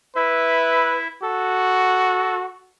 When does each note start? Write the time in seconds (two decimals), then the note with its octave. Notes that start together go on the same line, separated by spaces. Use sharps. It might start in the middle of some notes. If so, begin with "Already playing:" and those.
0.16 E4 B4 E5
1.23 F#4 A4